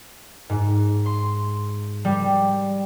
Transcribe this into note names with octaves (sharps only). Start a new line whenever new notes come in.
G#2
C6
G3